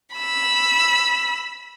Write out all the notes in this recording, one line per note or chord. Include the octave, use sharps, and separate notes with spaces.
B5 E6